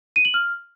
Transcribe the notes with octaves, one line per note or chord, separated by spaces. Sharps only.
D#7
F#7
F6